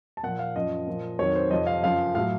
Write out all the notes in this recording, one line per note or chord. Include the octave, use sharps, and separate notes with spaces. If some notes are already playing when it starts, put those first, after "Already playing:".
A5
A#2 F3 F#5
F5
F#2 F3 D#5
A#2 F3
F2 D#3 F#3 C#5
C5
F2 C3 F3 D#5
F5
F#2 C#3 F3 F5
A2 F#3 F5